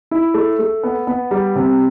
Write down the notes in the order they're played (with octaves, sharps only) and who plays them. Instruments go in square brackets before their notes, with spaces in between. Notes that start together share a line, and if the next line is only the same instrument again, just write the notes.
[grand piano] E4
A3
A3
B3
B3
G3
C3